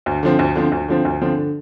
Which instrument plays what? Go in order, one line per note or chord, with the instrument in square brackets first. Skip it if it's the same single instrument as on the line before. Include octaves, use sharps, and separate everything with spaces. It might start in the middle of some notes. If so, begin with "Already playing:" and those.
[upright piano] D2
D3 F3 C4
D2
D3 F3 C4
D2
D3 F3 C4
D2
D3 F3 C4
D3